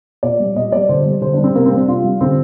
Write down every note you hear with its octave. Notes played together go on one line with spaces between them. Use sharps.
A#2 D5
G3
A#2 D#5
G3 D5
D3 C5
G3
D3 C5
G3 D4
C4
C3 A#3
C4
G3
D4
C3 F4
G3
D3 C4